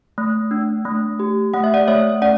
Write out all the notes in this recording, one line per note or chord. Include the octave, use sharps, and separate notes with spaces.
A3
D4
A3
G4
A3 F#5
E5
D5 F#5
A3 C#5 E5
C#4 D5 F#5